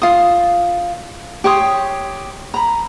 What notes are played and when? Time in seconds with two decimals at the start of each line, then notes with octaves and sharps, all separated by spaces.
0.02 F4 D#6
1.44 G4 C#5 C6 D#6
2.54 A#5 B5